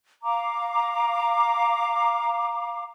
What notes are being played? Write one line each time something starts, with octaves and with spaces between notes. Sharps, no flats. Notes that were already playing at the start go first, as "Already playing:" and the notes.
F5 A#5 D6